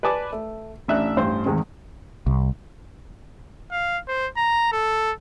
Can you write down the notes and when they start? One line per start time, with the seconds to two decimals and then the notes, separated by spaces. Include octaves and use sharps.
0.03 B4 D5 G#5 A5 D6
0.32 A3
0.88 A1 D4 E5 E6 F#6
1.17 A1 G2 C5
1.45 E2 G#2 D#3 G#3 C4
2.27 C2
3.71 F5
4.08 C5
4.37 A#5
4.72 A4